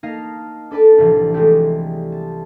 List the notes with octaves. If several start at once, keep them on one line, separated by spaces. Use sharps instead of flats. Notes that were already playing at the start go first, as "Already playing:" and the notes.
A#3 D#4 D#5 F5 A5
D4 A4 B4 D5 A5
C2 A2 E3 F3
G#3 A3 C4 E4 G4 A4
A5